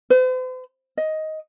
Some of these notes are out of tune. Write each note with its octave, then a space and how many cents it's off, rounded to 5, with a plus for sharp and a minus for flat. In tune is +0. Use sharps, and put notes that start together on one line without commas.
C5 -45
D#5 +10